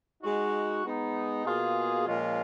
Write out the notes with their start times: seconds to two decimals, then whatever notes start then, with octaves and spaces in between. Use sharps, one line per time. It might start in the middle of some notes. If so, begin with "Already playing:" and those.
0.22 G#3 D#4 F#4
0.83 G#3 B3 D#4
1.44 B2 A#3 F4 G#4
2.05 A#2 F3 G#3 C#4 F4